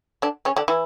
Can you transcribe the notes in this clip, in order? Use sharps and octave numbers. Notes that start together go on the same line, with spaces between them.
D3 D4
C#3 C#4
D3 D4
E3 E4